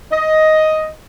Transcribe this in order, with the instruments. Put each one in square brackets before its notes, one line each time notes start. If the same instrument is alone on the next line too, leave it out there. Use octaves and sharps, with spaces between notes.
[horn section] D#5